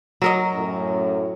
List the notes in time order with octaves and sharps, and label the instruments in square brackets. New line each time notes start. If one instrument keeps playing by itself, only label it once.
[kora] F#3 A#4 D#5
[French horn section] F#2 A2